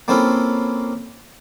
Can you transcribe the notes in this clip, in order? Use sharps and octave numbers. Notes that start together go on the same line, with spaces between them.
A#3 C4 C#4 E4 F4 A4